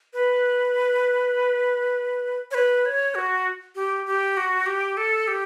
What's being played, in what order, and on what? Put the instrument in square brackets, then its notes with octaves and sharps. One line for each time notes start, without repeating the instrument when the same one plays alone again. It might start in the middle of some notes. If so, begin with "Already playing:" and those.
[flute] B4
C#5
B4
C#5
F#4
G4
G4
F#4
G4
A4
G4